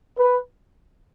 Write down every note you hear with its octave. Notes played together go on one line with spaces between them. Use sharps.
B4